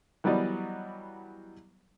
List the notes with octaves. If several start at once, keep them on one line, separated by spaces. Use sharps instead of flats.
E3 F#3 G3 B3 D5 D#5